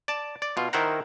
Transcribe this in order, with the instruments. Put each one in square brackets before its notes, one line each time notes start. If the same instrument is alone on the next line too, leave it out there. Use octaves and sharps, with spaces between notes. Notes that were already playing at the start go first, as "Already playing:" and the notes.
[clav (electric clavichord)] D5 A5
D5
B2 F4
D#3 E4 A#4 C5 F#5 A#5